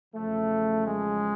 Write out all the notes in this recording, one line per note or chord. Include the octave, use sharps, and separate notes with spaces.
E2 C#3 F3 A3
G#3